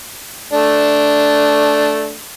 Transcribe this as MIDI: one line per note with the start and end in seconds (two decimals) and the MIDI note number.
0.53 2.17 57
0.53 2.17 62